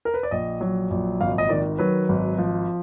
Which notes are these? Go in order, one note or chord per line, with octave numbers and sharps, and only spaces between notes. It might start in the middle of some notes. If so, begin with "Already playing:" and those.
A#4
B4
D5
A#1 D#5
F#3
A#1
G#1 F5
D#5
D#3 D5
F#3 B4
G#1
F3